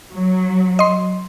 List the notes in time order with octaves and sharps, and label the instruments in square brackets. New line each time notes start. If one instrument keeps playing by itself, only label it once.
[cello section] F#3
[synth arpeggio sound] D#5 C6